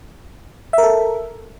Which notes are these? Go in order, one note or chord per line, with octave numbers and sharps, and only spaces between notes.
A4 A#4 E5